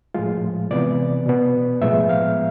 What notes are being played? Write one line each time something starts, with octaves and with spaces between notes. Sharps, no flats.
A2 F3 G#3 F4
C3 E3 B3 D5
B2 B3
A2 F3 G#3 B3 E5
F5